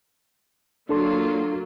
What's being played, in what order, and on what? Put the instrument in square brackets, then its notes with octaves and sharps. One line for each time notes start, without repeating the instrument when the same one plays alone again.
[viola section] F#3 A#3 F4 [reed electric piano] D4 A4 C6